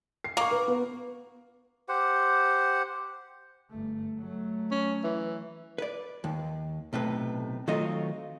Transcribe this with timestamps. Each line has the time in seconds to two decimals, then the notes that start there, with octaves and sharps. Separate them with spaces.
0.24 C7
0.37 A#3 A#5 C#6
0.51 B4
0.68 B3
1.89 G4 C5 F#5
3.70 G1 A3
4.19 F#3 A3
4.71 C#4
5.04 E3
5.78 B4 D5
6.24 D#2
6.93 B1 A2 C3 B4
7.67 D#3 F#3 A3 C4 F4 D#5